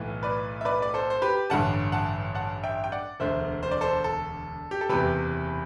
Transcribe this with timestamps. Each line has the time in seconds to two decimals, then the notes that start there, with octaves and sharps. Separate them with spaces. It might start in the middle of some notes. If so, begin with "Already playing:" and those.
Already playing: B1 A2 E3
0.23 B4 D5
0.61 E5
0.65 B4 D5
0.82 D5
0.94 A4 C5
1.10 C5
1.22 G4 B4
1.50 A1 G2 D3 F#5 A5
1.92 F#5 A5
2.35 F#5 A5
2.63 E5 G5
2.84 G5
2.92 D5 F#5
3.20 E1 D2 D3 C5 E5
3.63 C5
3.71 D5
3.81 A4 C5
4.04 A4
4.71 G4
4.81 A4
4.89 F#1 E2 C3 G4 B4